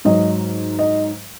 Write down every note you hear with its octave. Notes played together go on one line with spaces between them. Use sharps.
G#2 F#3 D#5
D#5